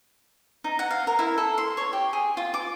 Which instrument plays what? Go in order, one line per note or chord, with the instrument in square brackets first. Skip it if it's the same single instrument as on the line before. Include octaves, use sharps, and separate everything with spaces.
[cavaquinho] D#4
F#5
F5
A#4
E4
A4
C6
C#5
G4
G#4
F4
D6